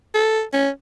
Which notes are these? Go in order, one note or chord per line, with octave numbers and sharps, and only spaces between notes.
A4
C#4